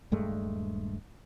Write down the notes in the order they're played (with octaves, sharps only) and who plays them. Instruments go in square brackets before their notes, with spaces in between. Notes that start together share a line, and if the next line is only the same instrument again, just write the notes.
[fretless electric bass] D#1 G2 G#3 A3